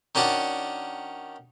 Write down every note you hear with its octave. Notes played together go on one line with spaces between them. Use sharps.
D#3 C#4 D4 F#4 D5